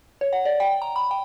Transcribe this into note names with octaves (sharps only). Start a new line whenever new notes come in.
C#5
F#5
D5
G5
A#5
B5
G5